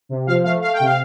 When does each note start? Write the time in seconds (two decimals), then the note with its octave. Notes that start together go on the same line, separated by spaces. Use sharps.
0.09 C3
0.27 F3 F5
0.44 A3 F5
0.61 A3 F5
0.73 G5
0.80 C3
0.85 F5